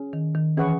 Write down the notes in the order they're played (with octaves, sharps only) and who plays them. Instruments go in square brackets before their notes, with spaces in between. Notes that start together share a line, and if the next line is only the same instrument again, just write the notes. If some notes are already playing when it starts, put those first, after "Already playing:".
Already playing: [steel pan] C#4 G#4
[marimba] D#3
D#3
[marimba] E3 [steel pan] C#4 G#4 B4 F#5 C#6